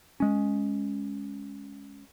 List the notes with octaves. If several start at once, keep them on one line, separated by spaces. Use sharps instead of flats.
G#3 C#4